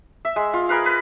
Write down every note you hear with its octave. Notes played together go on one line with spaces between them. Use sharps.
E5
G#3
F4
G#4 A#4 B4 F5
B4